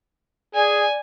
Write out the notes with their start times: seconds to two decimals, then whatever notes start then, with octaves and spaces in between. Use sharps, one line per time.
0.55 G#4 D5 G#5